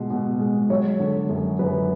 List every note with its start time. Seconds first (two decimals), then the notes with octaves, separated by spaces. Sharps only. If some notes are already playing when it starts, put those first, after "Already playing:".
Already playing: B2 G#3
0.10 B2
0.39 G#3
0.69 F#3 C#5
1.00 D3
1.29 F#2
1.59 F#2 B4